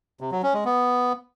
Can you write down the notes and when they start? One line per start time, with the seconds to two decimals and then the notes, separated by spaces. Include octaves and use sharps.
0.21 C3
0.32 F#3
0.43 C#4
0.54 G#3
0.65 B3